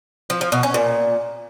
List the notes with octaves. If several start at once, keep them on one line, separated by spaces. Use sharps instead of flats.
F3
F3
B2
C#4
A#2